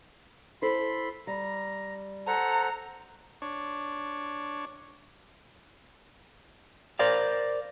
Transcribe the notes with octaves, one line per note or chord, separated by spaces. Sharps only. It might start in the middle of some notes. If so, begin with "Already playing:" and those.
E4 A4 C5 B5 C6
G3 A#5
A4 C5 F#5 A#5
D4 C#5
A#4 C5 D5 F5